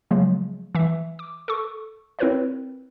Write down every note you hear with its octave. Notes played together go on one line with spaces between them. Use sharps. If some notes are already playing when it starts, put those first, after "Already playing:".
C#3 F3 F#3 G#3 A3
E3 E5
D6
A4 C#6
C4 E4 A#4 B4 C#5 D5